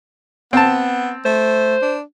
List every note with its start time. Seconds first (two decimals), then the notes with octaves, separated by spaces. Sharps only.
0.53 B3 C4 A5
1.25 A3 C5
1.82 D4